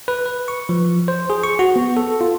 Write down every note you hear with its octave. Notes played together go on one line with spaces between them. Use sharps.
B4
B4
C#6
F3
C5
G#4
C#6
F#4
B3
A4
F4